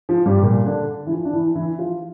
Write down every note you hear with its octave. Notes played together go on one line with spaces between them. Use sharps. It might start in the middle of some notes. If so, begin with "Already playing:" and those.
F3
G2 G3
A#2 A#3
D3 D4
E3
F3
D4
E3 E4
E3 E4
F3 F4